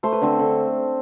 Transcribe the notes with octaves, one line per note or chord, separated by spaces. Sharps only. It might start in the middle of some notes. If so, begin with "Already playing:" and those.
A3 C5
B4
D3 C4 C5
D3